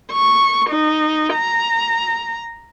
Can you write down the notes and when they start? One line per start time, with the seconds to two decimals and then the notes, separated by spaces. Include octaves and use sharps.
0.12 C#6
0.70 D#4
1.34 A#5